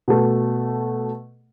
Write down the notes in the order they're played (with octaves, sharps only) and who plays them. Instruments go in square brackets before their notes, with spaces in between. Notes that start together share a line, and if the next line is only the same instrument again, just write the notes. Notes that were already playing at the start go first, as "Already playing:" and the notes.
[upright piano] B2 A3